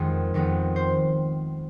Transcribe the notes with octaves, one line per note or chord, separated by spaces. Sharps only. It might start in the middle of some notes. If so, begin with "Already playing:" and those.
Already playing: F2 D#3 G#3 B3
F2 D#3 G#3 B3
C5